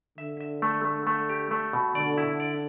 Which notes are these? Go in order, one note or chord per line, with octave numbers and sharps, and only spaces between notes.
D3 E5
E5
A3
A3
A3
G4
A3
B2
D3 D5
E4
D5